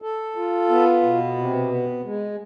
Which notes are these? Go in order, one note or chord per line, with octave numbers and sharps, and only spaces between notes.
A4
F4
B3
B2
C3
B3
G#3